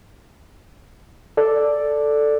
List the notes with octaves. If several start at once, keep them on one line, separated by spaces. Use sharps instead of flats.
A4 D5